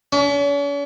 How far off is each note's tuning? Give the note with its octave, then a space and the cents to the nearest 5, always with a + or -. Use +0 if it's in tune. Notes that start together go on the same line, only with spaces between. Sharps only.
C#4 +45